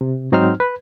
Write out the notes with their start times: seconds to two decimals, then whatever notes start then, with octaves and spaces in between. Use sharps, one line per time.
0.01 C3
0.32 G#2 F#3 C4 D#4 C5 F6
0.60 B4